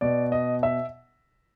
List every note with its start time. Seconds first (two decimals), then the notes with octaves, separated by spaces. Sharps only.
0.01 B2 D5
0.32 D#5
0.63 E5